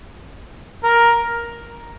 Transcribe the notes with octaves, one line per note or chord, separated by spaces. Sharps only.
A#4